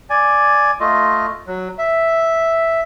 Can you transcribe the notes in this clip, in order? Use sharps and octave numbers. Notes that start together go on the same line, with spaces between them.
D5 G#5
A3 F4 D#5
F#3
E5